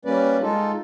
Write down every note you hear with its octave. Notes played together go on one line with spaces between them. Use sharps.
G3 A#3 C#4 B4 D5
G#3 D#4 F4 A4